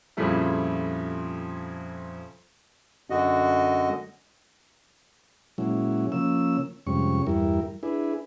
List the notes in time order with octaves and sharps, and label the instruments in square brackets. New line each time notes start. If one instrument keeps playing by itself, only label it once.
[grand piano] F2 A#2 C#3 G3 A3 E4
[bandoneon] F#2 D3 F#4 D#5
[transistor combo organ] A#2 F#3 G#3 C#4 E4
C#3 F3 A#3 C#4 E6
F2 G#2 C3 G3 C#4 C#6
E2 G2 G3 E4 A#4
D4 E4 G#4 B4